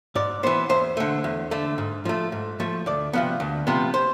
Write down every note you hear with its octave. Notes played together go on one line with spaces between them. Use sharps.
G#2 D5
E3 B3 C5
E2 C5
D3 A3
E2
D3 A3
G#2
F3 A3
G#2
F3 A3
D2 D5
C3 F3 B3
D2
C3 F3 B3
C5